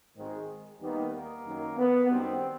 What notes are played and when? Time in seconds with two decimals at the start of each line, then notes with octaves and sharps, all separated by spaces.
0.16 G#1 G#2 D#3 G#3
0.80 D#2 D#3 G3 A#3 B3
1.13 A#3
1.45 F#2 D#3 F#3
1.77 B3
2.09 F#2 D#3 G3 C4